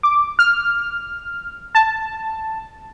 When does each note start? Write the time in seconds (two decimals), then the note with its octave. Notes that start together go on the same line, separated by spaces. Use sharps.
0.03 D6
0.39 F6
1.75 A5